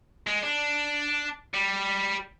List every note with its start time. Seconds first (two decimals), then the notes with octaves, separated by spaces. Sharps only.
0.27 G#3
0.43 D4
1.54 G3